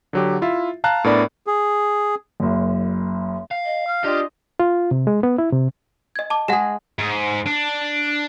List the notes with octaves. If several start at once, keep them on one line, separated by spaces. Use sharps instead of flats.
D3 F#3 G4
E4 F4 E5
F5 A5 A#5 F#6
A2 B3 D4 A#4 D5 B5
G#4
F#1 F#2
F5
D#5
F6
D4 F4 G4 D#5
F4
C3
G#3
B3
E4
C3
D#5 G#6
A5 D6
G#3 G#4 F#5 A#6 E7
G#2
D4